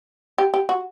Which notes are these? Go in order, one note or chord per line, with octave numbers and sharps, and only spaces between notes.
G4
G4
F#4